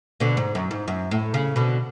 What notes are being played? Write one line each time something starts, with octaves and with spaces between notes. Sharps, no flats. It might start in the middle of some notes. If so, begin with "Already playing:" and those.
B2 D3
G#2
F#2
G#2
F#2
A2
C#3
B2 D3